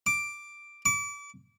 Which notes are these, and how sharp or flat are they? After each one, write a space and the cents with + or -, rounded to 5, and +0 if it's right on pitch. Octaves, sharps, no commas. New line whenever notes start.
D6 +5
D6 -30